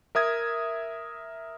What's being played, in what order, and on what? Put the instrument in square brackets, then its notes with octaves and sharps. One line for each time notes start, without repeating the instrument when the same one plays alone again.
[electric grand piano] A#4 E5 D#6 G#6